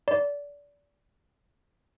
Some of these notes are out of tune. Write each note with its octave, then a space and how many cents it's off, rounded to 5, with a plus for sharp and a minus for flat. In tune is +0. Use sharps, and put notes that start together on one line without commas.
D5 -25